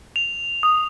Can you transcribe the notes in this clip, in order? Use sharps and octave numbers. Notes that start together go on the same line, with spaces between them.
F7
D#6